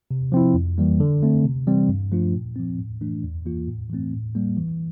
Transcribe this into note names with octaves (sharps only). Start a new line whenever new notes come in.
C3
F3 C4 E4
F2
E3 G3 A#3
D3
A3 C4
C3
E3 G3 C4
G2
F3 A3 D4 F4
A#2
F3 C4
A2
E3 A3 D4
E2
E3 A#3 F4
A2
E3 A3 C4
A2
G3 A#3
E3